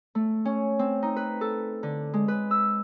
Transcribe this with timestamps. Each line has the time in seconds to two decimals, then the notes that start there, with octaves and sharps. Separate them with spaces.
0.15 A3
0.45 C#4
0.79 C4
1.03 D#4
1.16 B4
1.41 A4
1.83 D3
2.14 G#3
2.28 B4
2.51 E6